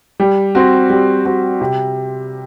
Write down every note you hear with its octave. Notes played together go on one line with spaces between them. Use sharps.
G3
C4 F#4
G3
C4 F#4
C3